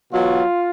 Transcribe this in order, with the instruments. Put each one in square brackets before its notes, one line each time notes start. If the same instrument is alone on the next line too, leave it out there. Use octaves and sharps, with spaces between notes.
[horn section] B2 F#3 F4